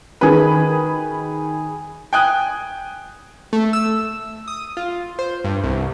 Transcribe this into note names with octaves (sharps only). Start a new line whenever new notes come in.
D#3 G#4 B4 B5
G5 G#5 D#6 F#6
A3
E6
D#6
F4
C5
G2
C2